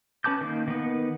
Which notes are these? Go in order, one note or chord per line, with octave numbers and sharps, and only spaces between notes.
C#4 B4 A5 D6 G6
D#3 A#3
D#3 B3